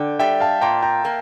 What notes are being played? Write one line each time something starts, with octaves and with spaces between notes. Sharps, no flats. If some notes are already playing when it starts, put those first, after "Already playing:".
Already playing: D3 G5
G3 E5 G5
F5 A5
A#2 G5 A#5
G5 A#5
A#3